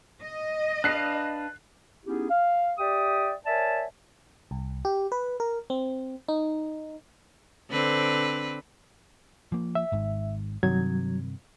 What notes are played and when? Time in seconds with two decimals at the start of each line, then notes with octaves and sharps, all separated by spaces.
0.22 D#5
0.84 D4 B4 F5 F#6 C7
2.05 B3 C#4 D#4 E4 G4 G#4
2.30 F5
2.78 G4 D5 E5 G5 D#6
3.46 A#4 C#5 D5 E5 G#5 A5
4.51 C2
4.85 G4
5.12 B4
5.40 A#4
5.70 C4
6.28 D#4
7.70 D3 C4 B4
9.52 F3 A#3
9.75 E5
9.92 G#1 G#2
10.63 G2 C3 D#3 F#3 G#6